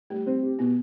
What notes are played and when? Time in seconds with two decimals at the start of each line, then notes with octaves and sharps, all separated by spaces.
0.10 G3 A3
0.26 C4
0.43 G4
0.59 B2 B3